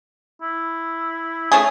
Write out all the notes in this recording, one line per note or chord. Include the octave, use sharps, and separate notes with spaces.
E4
A3 C#4 G#4 G#5